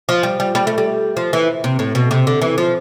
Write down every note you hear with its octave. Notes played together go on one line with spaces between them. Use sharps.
F3
G3
G3
G3
A3
G3
F3
E3
C3
A2
B2
C3
D3
E3
F3